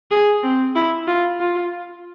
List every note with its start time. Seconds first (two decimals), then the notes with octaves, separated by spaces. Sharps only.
0.11 G#4
0.43 C4
0.75 E4
1.07 F4
1.40 F4